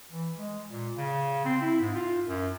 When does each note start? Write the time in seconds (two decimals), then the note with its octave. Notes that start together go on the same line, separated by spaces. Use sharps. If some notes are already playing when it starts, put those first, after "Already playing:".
0.11 E3
0.38 G#3
0.69 A#2
0.97 C#3
1.45 C4
1.61 E4
1.80 G#2
1.95 F4
2.26 F#2